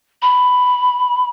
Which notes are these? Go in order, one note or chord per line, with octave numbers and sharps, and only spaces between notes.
B5